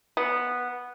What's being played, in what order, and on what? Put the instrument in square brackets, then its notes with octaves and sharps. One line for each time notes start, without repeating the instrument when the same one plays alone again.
[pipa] B3